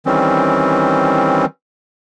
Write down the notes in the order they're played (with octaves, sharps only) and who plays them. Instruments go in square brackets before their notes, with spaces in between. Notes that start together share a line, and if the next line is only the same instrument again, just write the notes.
[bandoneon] D#3 E3 G3 C4 C#4